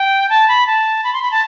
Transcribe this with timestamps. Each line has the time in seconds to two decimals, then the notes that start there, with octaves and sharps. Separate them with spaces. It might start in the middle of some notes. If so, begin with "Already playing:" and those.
Already playing: G5
0.30 A5
0.48 B5
0.67 A5
1.04 B5
1.13 C6
1.22 B5
1.31 A5